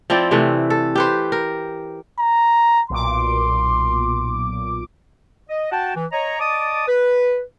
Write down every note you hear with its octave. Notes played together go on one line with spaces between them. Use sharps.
F3 C4 E4 D5
C3 E3 A3
A4
G4 B4 C5
A#4
A#5
B1 A#2 C6 D6
D#5
F#4 F#5 G5 A5
E3
C#5 D#5 A#5
D5 D#5 A5 D6 D#6
B4